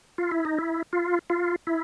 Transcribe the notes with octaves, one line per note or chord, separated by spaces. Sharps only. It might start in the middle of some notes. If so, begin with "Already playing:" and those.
F4
E4
D#4
E4
F4
F4
E4